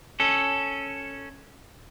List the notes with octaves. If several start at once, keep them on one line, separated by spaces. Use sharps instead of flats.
C#4 A4